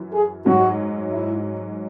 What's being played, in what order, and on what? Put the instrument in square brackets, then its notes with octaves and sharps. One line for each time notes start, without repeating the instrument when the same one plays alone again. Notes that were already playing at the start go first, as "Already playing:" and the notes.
Already playing: [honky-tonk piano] F#2 E3
[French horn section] G#4
[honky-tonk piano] G#2 F#3 C#4 [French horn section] F#4
[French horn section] E4